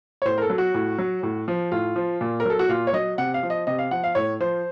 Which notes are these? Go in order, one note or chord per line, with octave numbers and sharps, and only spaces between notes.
C#5
A2 C5
A#4
A4
F#3
F#4
A2
F#3
A2
F3
A2 F4
F3
A#2
A#4
F#3 A4
F#4
A#2 F4
C#5
F#3 D#5
C3 F#5
F5
F3
D#5
C3 D#5
F5
F3 F#5
F5
A2 C#5
F3 C5